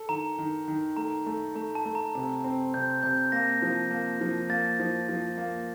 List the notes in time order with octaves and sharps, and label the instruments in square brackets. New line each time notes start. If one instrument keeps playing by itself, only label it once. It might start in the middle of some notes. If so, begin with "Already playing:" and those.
Already playing: [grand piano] A4
[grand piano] D#3 [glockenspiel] A#5
[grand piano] D#3
D#3
[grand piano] A3 [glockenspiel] A#5
[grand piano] A3
[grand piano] A3 [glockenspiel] A#5
[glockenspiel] A5
[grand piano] A3
[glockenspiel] A#5
[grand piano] C3 [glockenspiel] A#5
[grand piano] C4
[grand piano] C3 [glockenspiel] G6
[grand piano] C3 [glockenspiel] G6
[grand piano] A#3 [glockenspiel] A#6
[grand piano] F3
A#3
F3
[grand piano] A#3 [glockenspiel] A6
[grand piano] F3
F3
A#3